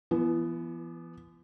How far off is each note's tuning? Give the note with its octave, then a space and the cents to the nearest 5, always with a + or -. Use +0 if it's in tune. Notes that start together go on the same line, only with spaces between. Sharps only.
E3 +40 B3 +0